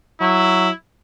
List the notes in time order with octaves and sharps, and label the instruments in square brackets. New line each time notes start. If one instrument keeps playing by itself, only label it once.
[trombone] F#3 [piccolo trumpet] E4